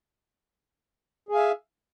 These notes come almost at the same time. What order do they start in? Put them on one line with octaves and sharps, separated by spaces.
G#4 G#5 F5 E5